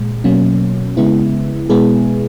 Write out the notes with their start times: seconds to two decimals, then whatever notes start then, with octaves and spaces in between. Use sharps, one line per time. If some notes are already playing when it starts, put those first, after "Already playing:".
Already playing: A#2 G#3
0.24 B2 F#3 A#3 C#4
0.97 C#3 G#3 B3 E4
1.70 B2 G#3 B3 E4 G#4